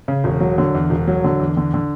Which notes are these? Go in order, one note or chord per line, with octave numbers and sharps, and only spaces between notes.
C#3
E1
F#3
D3
E2
E1
F#3
D3
E2
D3
D3